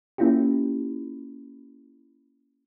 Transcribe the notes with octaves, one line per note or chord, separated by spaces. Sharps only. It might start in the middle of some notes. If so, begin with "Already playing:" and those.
A#3 C#4 E4 F4 G4